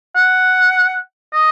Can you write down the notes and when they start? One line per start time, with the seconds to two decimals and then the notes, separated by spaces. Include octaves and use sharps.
0.15 F#5
1.33 D#5